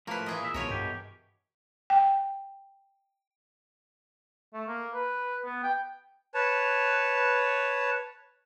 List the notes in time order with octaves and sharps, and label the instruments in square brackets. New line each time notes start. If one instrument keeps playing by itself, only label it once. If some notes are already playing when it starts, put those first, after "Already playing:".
[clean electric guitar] A2 F3 A#3 [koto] A#4 B4
[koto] E3 G#4 D#5
[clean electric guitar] A#2 A#4 E5
[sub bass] C2 [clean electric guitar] B2 D#3 F3 [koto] A#4 C#5 G#5
[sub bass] G2 [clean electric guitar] B2 G4
[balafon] G5
[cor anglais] A3
A#3
B4
B3
G5
[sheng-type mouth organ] B4 C#5 A5